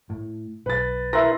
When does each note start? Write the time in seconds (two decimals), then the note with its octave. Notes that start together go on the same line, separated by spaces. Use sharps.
0.10 A2
0.66 B1 B4 A6
1.13 E4 A#4 B4 C6 A#6